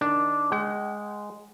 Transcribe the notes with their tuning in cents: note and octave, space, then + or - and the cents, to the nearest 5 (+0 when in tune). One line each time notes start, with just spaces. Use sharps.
D#3 +0 D4 -5
G#3 +0 F#5 +45